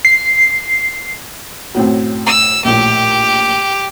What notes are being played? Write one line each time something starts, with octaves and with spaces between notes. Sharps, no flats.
C7
F#2 A2 C4
E6
A#1 A2 G4